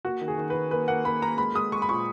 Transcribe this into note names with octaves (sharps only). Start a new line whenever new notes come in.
A#3 F#4
D#3
G#4
D#3
D#3 B4
A#3 B4
A#3 F#5
A#3 B5
A#3 A#5
G#3 B5
G#3 D#6
G#3 C#6
B5
A#2 C#6